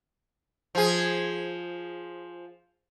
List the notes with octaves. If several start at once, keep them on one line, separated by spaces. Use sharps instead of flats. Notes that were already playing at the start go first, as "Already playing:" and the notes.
F3 G#4